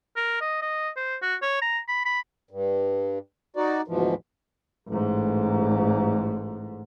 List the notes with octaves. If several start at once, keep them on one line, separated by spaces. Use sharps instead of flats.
A#4
D#5
D#5
C5
F#4
C#5
A#5
B5
B5
G2
D#4 F#4 D5
D2 G#2 B2 E3 F3
A1 G#2